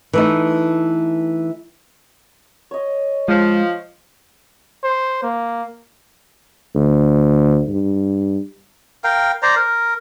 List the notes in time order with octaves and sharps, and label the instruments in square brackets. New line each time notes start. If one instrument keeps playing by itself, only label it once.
[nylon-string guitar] E3 A3 D#4
[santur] C#5 D#5
[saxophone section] F3 [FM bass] G#3
[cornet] C5
A#3
[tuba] D2
G2
[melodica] A#4 F5 G5
C5 D5 A#5
A#4